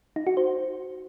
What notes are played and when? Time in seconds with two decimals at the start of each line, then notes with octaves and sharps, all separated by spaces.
0.16 D#4
0.27 F#4
0.37 C5